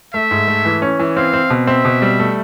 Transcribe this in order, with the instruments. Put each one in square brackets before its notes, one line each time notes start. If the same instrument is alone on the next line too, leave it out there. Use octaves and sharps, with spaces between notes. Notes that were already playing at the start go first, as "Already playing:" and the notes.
[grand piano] A3 [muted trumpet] E5
[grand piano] G#2
A3
E3
C#4
E3
[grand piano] C4 [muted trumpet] F5
[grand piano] C4
B2
[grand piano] C4 [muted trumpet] E5
[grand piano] B2
G3
A3